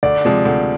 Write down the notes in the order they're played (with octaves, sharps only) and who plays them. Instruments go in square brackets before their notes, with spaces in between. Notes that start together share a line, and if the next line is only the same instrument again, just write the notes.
[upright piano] D2 [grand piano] D5
[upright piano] C3 F3 G#3
D2